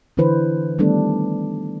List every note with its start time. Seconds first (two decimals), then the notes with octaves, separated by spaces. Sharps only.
0.17 D3 E3 D4 E4 B4 C5
0.78 D#3 G3 A3 B3 D4 A4